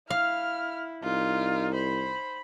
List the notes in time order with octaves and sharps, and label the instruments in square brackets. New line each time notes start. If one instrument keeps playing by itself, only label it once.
[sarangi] E4 [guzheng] F5 [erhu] F6
[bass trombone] C2 [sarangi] D#4 [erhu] F4
[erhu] C5 [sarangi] B5